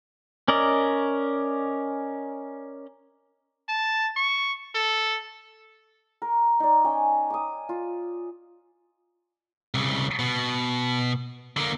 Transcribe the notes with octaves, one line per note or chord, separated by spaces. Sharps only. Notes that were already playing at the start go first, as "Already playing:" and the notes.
C#4 A#4 D5 D#5
A5
C#6
A4
A#4
D#4 D5
C#4 G5 G#5
D6 D#6
F4
C2 C#3
B2
D3 A#3